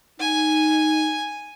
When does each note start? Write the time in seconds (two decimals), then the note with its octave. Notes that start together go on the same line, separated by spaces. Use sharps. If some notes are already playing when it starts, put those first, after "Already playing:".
0.20 D#4 G#5